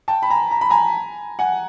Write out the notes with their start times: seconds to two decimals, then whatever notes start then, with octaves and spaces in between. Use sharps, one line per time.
0.08 G5 A5
0.22 B5
0.30 G#5 A#5
0.51 A#5
0.61 B5
0.70 G#5 A#5
1.39 F#5 G#5